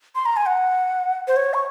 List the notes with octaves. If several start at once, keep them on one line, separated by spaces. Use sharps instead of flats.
C6
A#5
G#5
F#5
C5
C#5
C#6